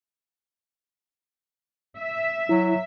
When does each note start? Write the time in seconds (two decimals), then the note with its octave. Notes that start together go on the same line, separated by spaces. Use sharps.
1.98 E5
2.49 F#3 E4